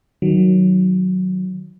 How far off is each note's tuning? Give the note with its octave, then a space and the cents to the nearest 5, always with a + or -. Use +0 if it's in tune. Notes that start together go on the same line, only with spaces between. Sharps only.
D#3 +0 F#3 +0